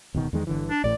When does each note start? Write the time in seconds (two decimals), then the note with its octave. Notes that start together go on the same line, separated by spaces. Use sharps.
0.14 D1 B2 D#3
0.33 E2 D#3 G#3
0.47 G1 D3 E3
0.69 D4
0.84 A1 A2 D5